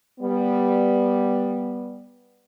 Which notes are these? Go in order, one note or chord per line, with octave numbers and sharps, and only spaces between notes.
G3 B3